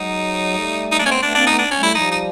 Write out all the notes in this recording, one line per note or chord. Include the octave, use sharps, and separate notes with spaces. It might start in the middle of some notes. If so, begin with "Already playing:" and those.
Already playing: F#3 G#3 D#4
G3 A3
D#4
G#3 A#3 D4
C#4
A3 B3 C4
A3 B3 D4
A#3 C4 D4
A3 B3 D#4
D4
C#4
G3 A3 E4
F3 G3 D#4
D#4